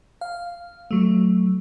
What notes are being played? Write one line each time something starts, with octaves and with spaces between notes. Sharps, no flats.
F5
F#3 A3